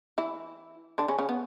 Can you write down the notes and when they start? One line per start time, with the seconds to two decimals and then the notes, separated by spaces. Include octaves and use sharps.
0.18 E3 E4
0.98 D3 D4
1.08 C#3 C#4
1.19 C#3 C#4
1.29 B3